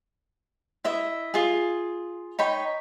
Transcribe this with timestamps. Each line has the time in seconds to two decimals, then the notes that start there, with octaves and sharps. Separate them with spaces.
0.84 E4 D#5 E5
1.34 F4 G#4
2.39 D#4 C#5 G5 B5